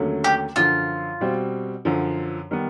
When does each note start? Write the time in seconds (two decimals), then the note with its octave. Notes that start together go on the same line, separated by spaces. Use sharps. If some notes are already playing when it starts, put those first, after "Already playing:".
Already playing: D#2 D3 F#3 A3 C#4
0.24 G4
0.56 F#2 D3 F3 F4
1.21 B2 G3 C4
1.85 F#2 D3 F3
2.51 D#3 G3 B3